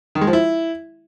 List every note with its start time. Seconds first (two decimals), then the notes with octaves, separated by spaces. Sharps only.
0.15 D#3
0.21 G#3
0.27 F3
0.33 E4